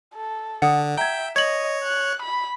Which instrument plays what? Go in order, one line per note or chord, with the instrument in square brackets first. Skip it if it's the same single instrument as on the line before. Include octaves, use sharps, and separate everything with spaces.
[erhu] A4
[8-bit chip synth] D3 [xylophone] F#5 D#6
[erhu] E5 [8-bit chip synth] G5 [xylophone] A#5 G#6
[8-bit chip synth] C#5 [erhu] D#5 [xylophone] G#6 F#7
[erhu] F#6
B5